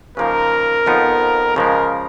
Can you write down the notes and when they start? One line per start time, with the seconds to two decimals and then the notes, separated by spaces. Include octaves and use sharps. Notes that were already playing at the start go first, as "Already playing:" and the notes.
0.17 C#3 F3 A#3 D#4 A#4
0.86 F2 F3 B3 D#4
1.56 C#3 F3 G#3 A#4